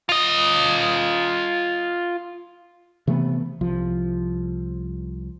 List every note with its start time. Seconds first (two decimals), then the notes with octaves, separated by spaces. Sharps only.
0.09 F4 D#5
3.07 C3 E3 A3 B3
3.61 C2 F3